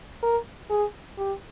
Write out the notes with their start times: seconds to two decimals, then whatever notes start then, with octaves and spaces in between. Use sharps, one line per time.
0.23 A#4
0.70 G#4
1.18 G4